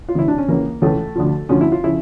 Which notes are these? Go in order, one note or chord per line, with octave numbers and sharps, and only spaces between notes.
F4
D2 C#3 E3 E4
D4
C#4
C#2 C#3 E3 A#3
C#2 C#3 E3 A3
D2 D3 F3
D2 D3 F3 C#4
E4
F4
C#3 F3 E4